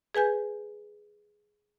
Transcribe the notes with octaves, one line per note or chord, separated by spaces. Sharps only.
G#4 B4 G#5 G6